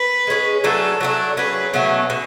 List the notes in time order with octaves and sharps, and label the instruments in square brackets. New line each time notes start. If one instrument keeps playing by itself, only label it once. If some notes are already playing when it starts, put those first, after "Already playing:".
Already playing: [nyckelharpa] B4
[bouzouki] G#3 C#4 G#4
[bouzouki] F#3 A3 D4 G#4 [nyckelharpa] A4
[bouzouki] F#3 A3 D4
[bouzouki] F#3 C#4 G#4 [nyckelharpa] B4
[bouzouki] B2 F#3 A3 C#4
B2